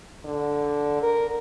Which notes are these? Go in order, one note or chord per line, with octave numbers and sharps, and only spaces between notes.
D3
A#4